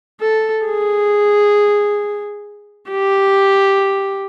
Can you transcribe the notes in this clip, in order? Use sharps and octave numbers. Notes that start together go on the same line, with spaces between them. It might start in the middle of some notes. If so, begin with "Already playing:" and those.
A4
G#4
G4